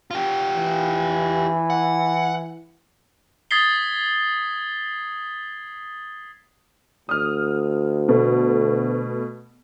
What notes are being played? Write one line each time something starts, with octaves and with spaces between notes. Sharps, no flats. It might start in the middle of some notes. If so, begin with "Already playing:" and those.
F4 G4
E3
F#5
D#6 G#6 A6 B6 C7 G7
D2 D#6 F6
B2 A3